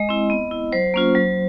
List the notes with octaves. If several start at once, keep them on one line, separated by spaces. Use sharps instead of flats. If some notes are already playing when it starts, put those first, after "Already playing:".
Already playing: G#3 D#5
C4 E4
B3
E4
F#3 C5
A#3 C#4 F4
F#3